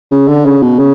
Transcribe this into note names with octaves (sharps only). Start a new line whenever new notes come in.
C#3
D3
C#3
B2
C#3